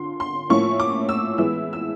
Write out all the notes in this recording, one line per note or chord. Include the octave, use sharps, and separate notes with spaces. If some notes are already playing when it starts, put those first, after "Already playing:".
Already playing: D3 F4 C6
C6
A2 F3 A#3 C#4 E4 C#6
D6
E6
E3 G#3 B3 E4 E6
E6